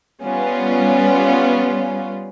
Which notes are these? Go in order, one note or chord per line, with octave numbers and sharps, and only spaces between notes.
G3 B3 C#4 F4